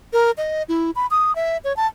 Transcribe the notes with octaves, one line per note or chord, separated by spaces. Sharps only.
A#4
D#5
E4
B5
D#6
E5
C#5
A5